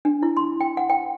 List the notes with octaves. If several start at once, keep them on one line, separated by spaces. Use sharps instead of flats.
D4
E4
C6
G5
F#5
G5